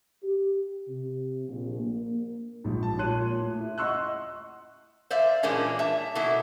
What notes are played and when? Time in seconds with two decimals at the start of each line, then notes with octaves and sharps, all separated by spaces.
0.22 G4
0.87 C3
1.48 A#1
1.79 A#3
2.64 A#1 G#2
2.83 A5
2.98 A#2 C#5 C6 F#6 D#7
3.40 A2
3.60 E4
3.78 D#5 F#5 C6 C#6 E6 F#6
5.11 C5 D5 E5 F5
5.43 A#2 E3 G#3 A#3 C#4 D4
5.79 E5 A5
6.15 B2 A#3 E4 A4